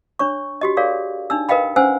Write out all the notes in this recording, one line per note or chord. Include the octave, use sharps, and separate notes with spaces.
D4 C#5 C#6
F#4 G4 D#5
G#4 A#4 C#5 D5 F5
D4 D#4 E6
A#4 B4 D#5 F5 G5 B5
C#4 C5 F#5 G#5 E6